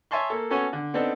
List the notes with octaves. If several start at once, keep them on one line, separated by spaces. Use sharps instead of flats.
C#5 E5 G#5 A5 C6 C#6
A#3 A4
B3 C#4 F#4 A4 C#5 G#5
D3
B3 C4 D4 D#4 A4